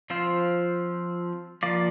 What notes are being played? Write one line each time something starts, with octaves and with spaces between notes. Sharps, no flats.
F3 C4 F4 C5
F3 A#3 F4 D5